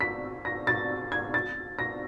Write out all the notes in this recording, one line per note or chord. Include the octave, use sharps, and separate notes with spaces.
B6
A#6
A6
G#6
A6
A#6